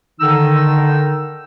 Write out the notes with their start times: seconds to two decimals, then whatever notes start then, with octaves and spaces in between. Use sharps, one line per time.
0.19 D3 D#3 D#4 E6